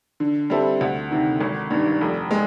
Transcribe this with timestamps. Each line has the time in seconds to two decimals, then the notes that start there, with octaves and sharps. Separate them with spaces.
0.20 D3
0.50 G3 C4 E4 A4
0.81 D2
1.11 C3 D#3
1.41 G#1
1.70 G2 D#3
2.01 F1
2.31 G#3